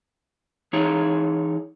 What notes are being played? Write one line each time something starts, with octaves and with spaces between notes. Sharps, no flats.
E3 D#4 G#4 C#5